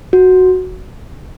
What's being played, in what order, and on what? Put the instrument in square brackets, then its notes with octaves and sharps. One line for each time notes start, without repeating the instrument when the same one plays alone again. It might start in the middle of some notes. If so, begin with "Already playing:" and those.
[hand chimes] F#4